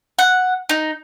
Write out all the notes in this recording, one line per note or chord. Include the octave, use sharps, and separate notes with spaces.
F#5
D#4